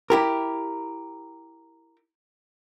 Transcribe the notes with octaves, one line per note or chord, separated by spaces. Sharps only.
E4 G4 A#4